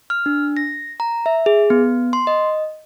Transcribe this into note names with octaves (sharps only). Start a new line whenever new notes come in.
F6
D4
A#6
A#5
E5
G#4
B3
C6
D#5